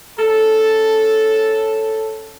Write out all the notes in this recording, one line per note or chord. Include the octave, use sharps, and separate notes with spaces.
C#4 A4